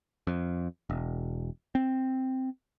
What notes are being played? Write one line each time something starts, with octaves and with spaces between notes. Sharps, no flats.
F2
E1
C4